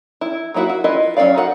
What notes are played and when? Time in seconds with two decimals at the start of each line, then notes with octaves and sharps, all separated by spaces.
0.21 E4
0.54 F#3 A#3 D4 E4 F#4
0.69 F#4
0.84 E4 F4 B4 D#5
1.17 F#3 C#4 B4 D5 F5
1.35 D#4 F#4 B4 F#5